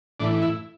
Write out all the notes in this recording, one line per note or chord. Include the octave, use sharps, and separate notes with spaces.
A2 E3 D4
E4